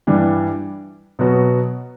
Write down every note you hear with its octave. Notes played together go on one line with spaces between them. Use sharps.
G2 E3 G3 D4
B2 F#3 B3 F#4